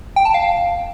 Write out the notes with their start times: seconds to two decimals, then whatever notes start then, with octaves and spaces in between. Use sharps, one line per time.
0.16 G5
0.25 A5
0.34 F5